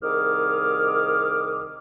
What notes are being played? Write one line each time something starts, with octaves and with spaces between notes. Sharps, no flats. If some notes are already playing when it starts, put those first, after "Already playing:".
C2 D#3 G#4 D6 D#6 F6